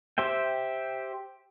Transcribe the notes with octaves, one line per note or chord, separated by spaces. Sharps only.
G4 C5 E5 G5